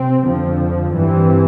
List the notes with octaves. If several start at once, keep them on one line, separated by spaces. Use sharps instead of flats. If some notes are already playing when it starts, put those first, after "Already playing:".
Already playing: C3 C4
F2 D3 F3
G2 E3 G3 C4